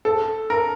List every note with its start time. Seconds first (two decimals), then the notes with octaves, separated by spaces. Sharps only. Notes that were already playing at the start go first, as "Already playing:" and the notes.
0.05 A4
0.50 A#4